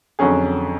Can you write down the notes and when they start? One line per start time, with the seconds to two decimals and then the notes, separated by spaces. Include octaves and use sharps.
0.19 F2 D3 F#3 C#4 G#4